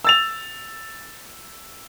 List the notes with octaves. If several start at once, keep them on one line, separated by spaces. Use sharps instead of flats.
E6 A6 F7